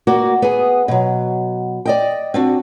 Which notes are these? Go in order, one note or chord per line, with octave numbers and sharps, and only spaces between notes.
A#3 F#4 D5
B3 G#4
B2 F#3
D5 D#5 G5
C4 D4 F#4